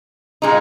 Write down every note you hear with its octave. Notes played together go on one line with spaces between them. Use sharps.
A#2 G#3 D#4